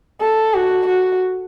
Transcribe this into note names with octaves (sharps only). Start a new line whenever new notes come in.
A4
F#4
F#4